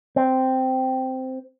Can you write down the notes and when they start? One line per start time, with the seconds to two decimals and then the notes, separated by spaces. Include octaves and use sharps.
0.16 C4